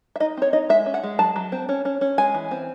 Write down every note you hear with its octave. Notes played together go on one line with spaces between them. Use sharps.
E5
D#4 D#5
C4 C#5
D#4 D#5
G#3 E5
C#4
F#5
G#3
F#3 A5
F#3
C4
C#4
C#4
C#4
G#3 G#5
E3
C4